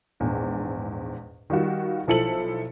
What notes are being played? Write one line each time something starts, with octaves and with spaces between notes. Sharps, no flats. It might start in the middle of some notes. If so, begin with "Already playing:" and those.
A#1 E2 G#2
D#3 G3 F4 F#4
B1 F3 E4 A4 C5 F#7